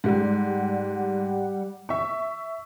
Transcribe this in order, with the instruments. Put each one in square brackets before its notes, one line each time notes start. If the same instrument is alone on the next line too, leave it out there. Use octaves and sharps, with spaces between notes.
[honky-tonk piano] G#2 [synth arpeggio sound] G3 G4 F#5
[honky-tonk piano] E5 C#6